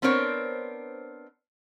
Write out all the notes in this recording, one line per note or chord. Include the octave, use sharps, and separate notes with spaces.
B3 C4 D4 A#4 C5 C#5